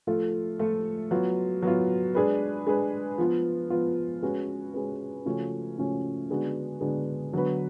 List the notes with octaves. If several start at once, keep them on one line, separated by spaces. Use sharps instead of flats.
F3 A3 F4 A4
F3 A3 F4 A4
F#3 B3 F4
F#3 B3 F4
G#3 D4 G#4 B4
G#3 D4 G#4 B4
F3 B3 F4
F3 B3 F4
G#3 C#4 F#4 B4
G#3 C#4 F#4 B4
C#3 F3 A3 C#4 F#4
C#3 F3 A3 C#4 F#4
D3 G#3 B3 D4 F#4
D3 G#3 B3 D4 F#4
D3 F#3 B3 F#4 B4